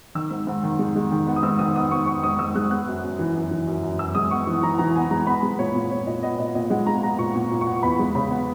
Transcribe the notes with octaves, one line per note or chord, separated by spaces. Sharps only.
D#3 E6
G#2
G#2
D#3
G#3
G#3
D#3
B3
D#6
G#2 E6
D#3 D#6
B3 D#6
G#2 C#6
B3 C#6
G#2 D#6
G#2 E6
G#3 F#6
B3 F#6
F#2
F#2
E3
F#2
E3
F#2
F#2
F#2 E6
G#3 D#6
B3 C#6
E3
E3 A#5
E3 A#5
B3 G#5
G#3 A#5
B3 B5
G#3
A#2 C#5
A#2
A#2 C#5
A#2 D#5
B3 D#5
A#2 D#5
A#2 D#5
G#3 F#5
G#3 A#5
B3 A#5
A#2 C#6
A#2
A#2
C#6
B3
E2 B5
G#3
C#3 B5
B3